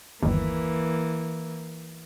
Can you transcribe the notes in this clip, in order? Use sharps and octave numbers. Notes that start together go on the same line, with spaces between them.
G1 D#2 E3 A#3